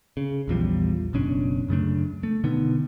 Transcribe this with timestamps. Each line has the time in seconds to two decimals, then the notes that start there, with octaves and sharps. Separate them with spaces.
0.17 C#3
0.48 A#1 E2 F3 G3
1.13 F#1 B2 C#4 D4
1.69 F#2 C#3 A3 D4
2.23 A3
2.44 B2 D3 D#3 B3